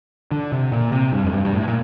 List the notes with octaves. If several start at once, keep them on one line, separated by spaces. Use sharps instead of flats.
D3
C3
A#2
C3
G2
F2
G2
G2
A2
A#2